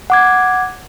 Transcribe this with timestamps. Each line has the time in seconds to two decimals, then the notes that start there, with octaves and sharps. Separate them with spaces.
0.10 F#5 D6 G#6